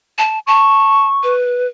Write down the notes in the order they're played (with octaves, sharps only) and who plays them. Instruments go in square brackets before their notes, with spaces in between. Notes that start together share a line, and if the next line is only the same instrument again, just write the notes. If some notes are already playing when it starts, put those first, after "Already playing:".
[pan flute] A5
[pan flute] A5 [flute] C#6
[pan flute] B4